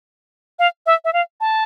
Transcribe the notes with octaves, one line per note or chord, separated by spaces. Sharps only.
F5
E5
E5
F5
A5